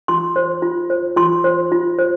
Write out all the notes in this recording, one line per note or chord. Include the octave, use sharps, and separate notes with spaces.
F4 C6
C5
F4
C5
F4 C6
C5
F4
C5